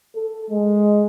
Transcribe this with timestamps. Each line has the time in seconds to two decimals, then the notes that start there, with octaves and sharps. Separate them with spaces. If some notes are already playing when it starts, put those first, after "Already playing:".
0.15 A4
0.50 G#3